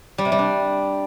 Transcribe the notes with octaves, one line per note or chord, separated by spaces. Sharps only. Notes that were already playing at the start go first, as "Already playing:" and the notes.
G3
C3
G3
D4